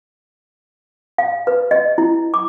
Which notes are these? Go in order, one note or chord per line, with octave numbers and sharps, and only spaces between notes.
F5
B4
D#5
E4
D6